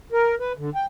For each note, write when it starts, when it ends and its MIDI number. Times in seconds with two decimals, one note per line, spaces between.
0.12 0.35 70
0.40 0.52 71
0.58 0.70 50
0.75 0.86 79